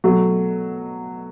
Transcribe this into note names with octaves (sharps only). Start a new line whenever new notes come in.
B2 F#3 A3 F#4